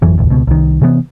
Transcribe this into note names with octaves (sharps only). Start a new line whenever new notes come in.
G#1 F2 E3 F#3
E1 A1 D2
C#2 B2
C2 D#3
C3 E3 F3 B3